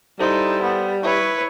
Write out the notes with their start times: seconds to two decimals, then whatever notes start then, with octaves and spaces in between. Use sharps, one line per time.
0.20 G3 D#4 E4 A4 C5 A5 C6
0.62 B3
1.03 E4 B4 C#5 E5 C#6